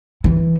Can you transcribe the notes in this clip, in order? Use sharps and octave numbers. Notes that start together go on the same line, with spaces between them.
E3